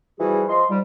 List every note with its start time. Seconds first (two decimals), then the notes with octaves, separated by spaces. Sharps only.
0.20 E3 F3 G3 F#4 G#4
0.49 F3 D#5 C6
0.70 G#2 F3 G3